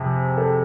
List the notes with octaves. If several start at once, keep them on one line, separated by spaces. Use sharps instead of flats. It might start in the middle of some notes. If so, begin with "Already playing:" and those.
Already playing: F2 C3 G#4
A4